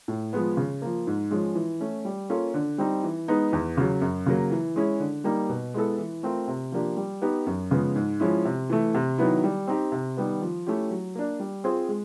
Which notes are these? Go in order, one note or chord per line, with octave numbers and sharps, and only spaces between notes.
A2
F3 G#3 B3
C#3
F3 A#3
G#2
F3 G#3 C#4
E3
A3 C#4
G3
A#3 C#4 F4 A4
D3
G3 C4 D#4
E3
G#3 B3 D#4
E2
C#3 F#3
F#2
C#3 F#3 A#3
E3
G#3 C#4 E4 G#4
D3
G3 A#3 D#4
B2
G#3 B3 E4 A4
E3
A3 C4 F4 A#4
C3
F3 A#3 D4 G4
G3
B3 D#4 G4
F#2
C#3 F3 G#3 B3
G#2
F3 G#3 C#4 E4
C3
E3 A3
C3
D#3 F#3 B3 E4
G3
C4 D#4 G4
C3
D#3 G3 B3
F3
A3 C#4 E4 G4
F#3
A#3 D4
G3
C4 F4 G#4 C5
G#3